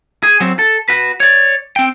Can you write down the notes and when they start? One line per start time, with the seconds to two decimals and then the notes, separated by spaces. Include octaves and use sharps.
0.23 G#4
0.40 F#3 C4
0.59 A4
0.89 F#4 B4
1.20 C#5 D5
1.76 C4 G5